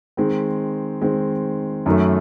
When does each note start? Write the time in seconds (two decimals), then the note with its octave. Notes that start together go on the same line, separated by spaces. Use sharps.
0.17 D#3 G#3 C4
1.01 D#3 G#3 C4
1.86 F#2 D#3 F#3 A3